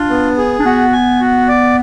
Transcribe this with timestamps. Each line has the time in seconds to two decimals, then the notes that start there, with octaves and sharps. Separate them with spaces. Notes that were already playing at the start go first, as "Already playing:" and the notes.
Already playing: D4 F4
0.10 B3
0.37 G#4
0.60 D4
0.65 B3 F#4
0.93 G#5
1.20 F#4
1.48 D5